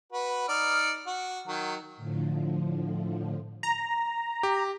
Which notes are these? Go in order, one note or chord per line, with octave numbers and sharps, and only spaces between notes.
F#4 B4
D#4 D5 F6
F#4
D#3 F#3
A2 D3 F3
A#5
G4